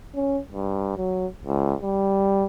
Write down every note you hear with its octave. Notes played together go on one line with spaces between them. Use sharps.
C#4
G2
F#3
C#2
G3